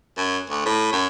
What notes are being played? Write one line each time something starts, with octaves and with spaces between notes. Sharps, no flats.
F#2
D2
A2
F#2